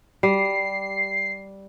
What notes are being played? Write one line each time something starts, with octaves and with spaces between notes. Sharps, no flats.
G3 C7